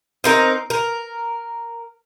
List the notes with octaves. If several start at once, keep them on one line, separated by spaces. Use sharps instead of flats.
C4 D#4 A#4
A#4